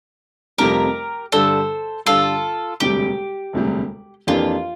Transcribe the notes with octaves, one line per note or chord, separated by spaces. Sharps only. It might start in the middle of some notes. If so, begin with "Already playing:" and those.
F1 F2 C3 G3 G4 A#4
G2 D3 G3 D4 A4 C5
G2 D3 G3 D4 F4 A4
E1 D2 C3 G3 G4
E1 D2 C3 G3
F2 E3 A#3 D4 F4 G4